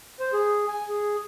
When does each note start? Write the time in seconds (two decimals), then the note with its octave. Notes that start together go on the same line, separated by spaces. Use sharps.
0.20 C5
0.33 G#4
0.68 G#5
0.89 G#4